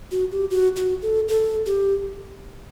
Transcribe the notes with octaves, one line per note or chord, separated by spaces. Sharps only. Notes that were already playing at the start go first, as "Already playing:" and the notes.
F#4
G4
F#4
F#4
A4
A4
G4